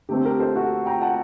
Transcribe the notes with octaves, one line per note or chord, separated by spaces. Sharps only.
D3 A3 C4 G4
G4 A#4
A4 C5
F#4 A4
G5 A#5
F#5 A5